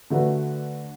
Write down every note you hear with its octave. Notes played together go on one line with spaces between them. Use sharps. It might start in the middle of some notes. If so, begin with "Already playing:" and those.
D3 A3 D4 F#4 B4